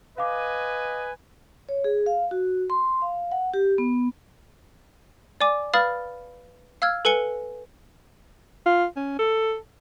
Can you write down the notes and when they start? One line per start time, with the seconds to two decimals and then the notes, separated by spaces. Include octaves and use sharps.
0.18 B4 D#5 F5 G#5 D6
1.69 C#5
1.84 G#4
2.06 F5
2.31 F#4
2.70 C6
3.02 F5
3.32 F#5
3.54 G4
3.78 B3
5.41 D5 G#5 D6
5.74 B4 F5 B5 D#6 F6 A6
6.82 F5 E6 F6 G#6
7.05 A4 B4 G#5 C#7 G7
8.66 F4
8.96 C#4
9.19 A4